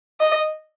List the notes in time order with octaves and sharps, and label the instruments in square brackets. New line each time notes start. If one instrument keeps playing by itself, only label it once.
[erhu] D#5